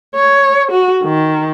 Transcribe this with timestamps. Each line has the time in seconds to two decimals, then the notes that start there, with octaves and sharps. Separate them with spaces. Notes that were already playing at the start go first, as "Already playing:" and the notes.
0.15 C#5
0.72 F#4
1.04 D#3